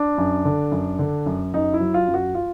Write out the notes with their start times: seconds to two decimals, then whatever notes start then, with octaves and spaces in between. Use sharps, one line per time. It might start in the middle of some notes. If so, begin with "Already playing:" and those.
Already playing: D4
0.18 F#2
0.45 D3
0.71 F#2
0.99 D3
1.26 F#2
1.54 F#2 D#4
1.73 E4
1.80 F#3
1.94 F4
2.08 F#2
2.14 F#4
2.34 F4